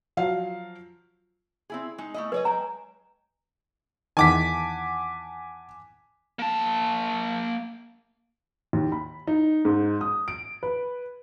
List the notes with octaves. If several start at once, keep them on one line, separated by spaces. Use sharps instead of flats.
F3 F#3 F5
C4 E4 G#4
G#3 D#4
A3 E4 D#5
G#4 B4 C#5 D#5
G#3 G5 A#5
E2 D#3 F#5 G#5 A5 D6 B6
A#3 A5
D#2
B5
D#4
G#2
D#6
D7
B4